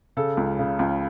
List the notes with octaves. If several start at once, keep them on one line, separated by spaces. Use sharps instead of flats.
C#3 A4
C#2
C#3
C#2